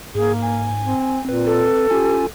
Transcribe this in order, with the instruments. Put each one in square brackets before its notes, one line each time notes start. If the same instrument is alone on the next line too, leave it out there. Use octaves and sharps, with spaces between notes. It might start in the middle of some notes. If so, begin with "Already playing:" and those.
[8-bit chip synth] G#2 [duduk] A#3 [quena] G#4
[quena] G#5
[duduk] C4
[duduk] A#2 [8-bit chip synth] C4 B4
[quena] A4
[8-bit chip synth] C#4 F4 G#5 [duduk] G4